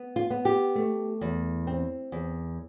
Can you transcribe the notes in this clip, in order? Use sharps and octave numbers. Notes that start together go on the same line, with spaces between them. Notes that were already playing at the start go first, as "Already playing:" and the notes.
Already playing: B3
F4
B3
G4
A3
E2
C4
E2